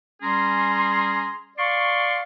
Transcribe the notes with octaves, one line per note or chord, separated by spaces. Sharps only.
G3 C#4 G#4 A#5 C6
D5 F5 C6 C#6